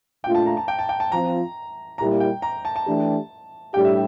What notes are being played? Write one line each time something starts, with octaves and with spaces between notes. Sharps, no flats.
A#2 A3 D4 F4 G5
A5
A#5
A5
G5
A5
G5
A5
F3 C4 F4 A#5
A#2 G3 A#3 E4 G4 A#5
G5
A#5
A5
A5
E3 A3 D4 G4
A2 G3 D4 G4 G5
E5